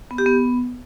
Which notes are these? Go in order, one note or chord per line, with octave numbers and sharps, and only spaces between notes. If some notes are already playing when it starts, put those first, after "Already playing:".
B3
G4
B3